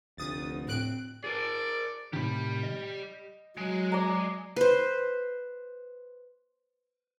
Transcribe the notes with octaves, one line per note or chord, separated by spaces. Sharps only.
F1 D2 D#6 A6
A2 C4 F#6 D7
G#4 A#4 D5
A2 C3 D#3 G4 B5
D#5
F#3 G#3
D5 A#5
B4 C5